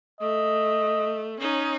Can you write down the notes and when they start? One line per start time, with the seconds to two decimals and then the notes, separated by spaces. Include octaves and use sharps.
0.21 A3 D#5
1.40 C#4 D#4